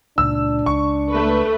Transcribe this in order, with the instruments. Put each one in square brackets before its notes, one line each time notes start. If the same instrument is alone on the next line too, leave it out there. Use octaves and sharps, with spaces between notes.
[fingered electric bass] C#2 A#2 [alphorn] D4 [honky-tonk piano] E6
[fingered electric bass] C#2 [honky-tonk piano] C#6
[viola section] A3 B4